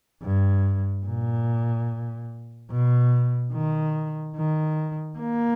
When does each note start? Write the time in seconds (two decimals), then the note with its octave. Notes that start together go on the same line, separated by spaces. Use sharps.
0.22 G2
1.06 A#2
2.71 B2
3.53 D#3
4.36 D#3
5.19 A#3